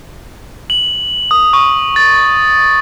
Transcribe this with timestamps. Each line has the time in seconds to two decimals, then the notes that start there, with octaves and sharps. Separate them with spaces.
0.70 F#7
1.31 D#6
1.53 C#6
1.96 A6